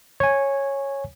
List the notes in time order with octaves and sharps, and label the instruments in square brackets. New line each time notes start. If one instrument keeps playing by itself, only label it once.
[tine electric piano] C#5 G#5